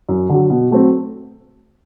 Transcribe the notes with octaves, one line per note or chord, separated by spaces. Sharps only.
F#2
D3 F#3
B2
F#3 A3 C4